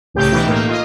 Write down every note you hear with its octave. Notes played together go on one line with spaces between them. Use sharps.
C2 A2 C#3 G4 G6
B2 E3 D#4 G4
A2 A#3
F4 D#5